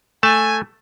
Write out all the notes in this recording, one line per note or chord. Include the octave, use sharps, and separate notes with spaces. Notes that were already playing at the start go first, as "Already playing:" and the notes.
A3 G#5 A5